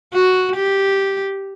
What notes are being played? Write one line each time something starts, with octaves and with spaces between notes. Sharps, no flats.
F#4
G4